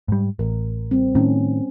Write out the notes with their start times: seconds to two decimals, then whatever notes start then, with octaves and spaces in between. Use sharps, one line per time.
0.08 G#2 G3
0.39 A1 A#4
0.91 G3 C4
1.15 A2 D#3 C#4